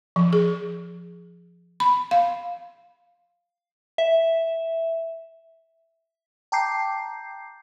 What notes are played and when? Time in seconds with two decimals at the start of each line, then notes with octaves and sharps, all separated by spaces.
0.16 F3
0.33 G#4
1.80 B5
2.11 F5
3.98 E5
6.52 G5 A5 A#5 D6 G6 C7